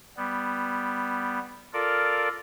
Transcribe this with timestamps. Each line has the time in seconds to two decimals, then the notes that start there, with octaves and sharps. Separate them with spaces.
0.17 G3 B3
1.73 F4 A4 A#4 D5